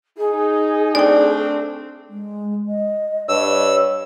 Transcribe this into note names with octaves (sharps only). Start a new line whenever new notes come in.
D#4 G#4
A3 C4 D4 D5 G5
G#3
D#5
G2 C#5 E6